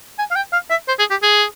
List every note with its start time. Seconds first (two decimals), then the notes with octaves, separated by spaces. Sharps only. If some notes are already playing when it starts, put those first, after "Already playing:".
0.19 G#5
0.31 F5
0.36 G5
0.53 F5
0.70 E5
0.88 C5
0.99 G#4
1.10 G4
1.23 G#4